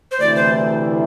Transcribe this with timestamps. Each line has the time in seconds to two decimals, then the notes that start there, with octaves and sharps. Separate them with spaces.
0.11 C5
0.20 D2 C3 E3 A3 E4 D5
0.36 C5